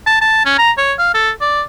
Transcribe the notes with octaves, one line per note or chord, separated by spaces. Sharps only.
A5
A5
C#4
A#5
C#5
F5
A4
D5